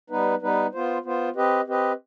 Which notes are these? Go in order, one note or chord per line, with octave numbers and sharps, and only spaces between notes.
G3 B3 D#4 B4
G3 B3 D#4 B4
B3 F4 C5
B3 F4 C5
C4 G4 B4 D#5
C4 G4 B4 D#5